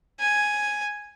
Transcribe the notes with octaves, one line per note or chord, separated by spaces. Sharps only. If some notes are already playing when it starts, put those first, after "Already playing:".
G#5